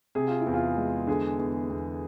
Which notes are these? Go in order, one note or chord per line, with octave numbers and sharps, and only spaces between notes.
C3 G#4
F4
E4
E2
F4
G#3
D3 G#4
E2
E2